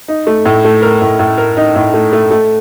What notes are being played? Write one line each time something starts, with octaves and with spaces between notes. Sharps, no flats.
D#4
A3
A2
A3
A#4
A2
A2
A#4
D#4
A2
A3
A3
A3